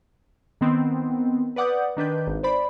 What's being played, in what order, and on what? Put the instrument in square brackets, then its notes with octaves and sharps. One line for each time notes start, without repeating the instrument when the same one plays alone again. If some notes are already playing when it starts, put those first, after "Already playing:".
[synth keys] D#3 B3 C4
B4 D5 F#5 D6 D#6 G6
D#3 D4 B4 G6
G#1
C5 D5 B5